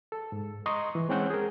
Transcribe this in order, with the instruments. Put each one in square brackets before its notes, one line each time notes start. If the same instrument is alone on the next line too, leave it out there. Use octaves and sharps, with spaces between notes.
[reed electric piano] A4
G#2
D#5 A#5 C6 C#6 D#6
E3
G#3 C4 C#4 F#5 G6
G#4 A#4